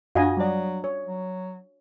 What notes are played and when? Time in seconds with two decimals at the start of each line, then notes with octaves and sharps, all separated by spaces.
0.15 F#2 D4 F4 F#4 D#5 F5 G#5
0.37 F#3 G3 D5
0.84 C#5
1.07 F#3